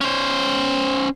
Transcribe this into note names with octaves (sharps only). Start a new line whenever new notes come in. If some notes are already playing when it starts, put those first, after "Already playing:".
C#4 C5